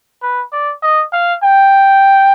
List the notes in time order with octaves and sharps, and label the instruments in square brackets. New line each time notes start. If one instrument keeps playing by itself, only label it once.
[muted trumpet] B4
D5
D#5
F5
G5